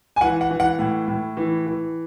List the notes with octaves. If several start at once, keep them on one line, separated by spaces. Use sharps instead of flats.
G#5
E3 F#5
F#5
E3
F#5
A2
A2
E3
E3